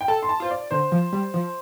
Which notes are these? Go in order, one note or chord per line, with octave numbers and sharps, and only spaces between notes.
G5
A4 A5
C6
A5
F4 C5
D5
D3 C5
F3
G3
F3